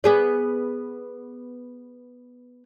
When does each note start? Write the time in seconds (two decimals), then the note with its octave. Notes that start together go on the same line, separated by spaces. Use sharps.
0.04 B3 G#4 D5